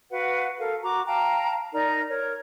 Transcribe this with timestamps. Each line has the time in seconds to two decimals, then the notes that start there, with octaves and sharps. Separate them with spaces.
0.11 F#4 B4 F5 F#5
0.58 A4 A#4 F5
0.83 F#4 A#5 D6
1.06 F5 G5 A5 A#5
1.73 D#4 A#4 D5 A#5
2.09 A#4 C#5